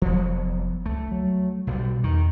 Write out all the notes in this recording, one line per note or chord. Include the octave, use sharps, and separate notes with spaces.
F1 F3 F#3 B3
C#2 A3
F#3
B1 B2 E3 G3
E2 D#3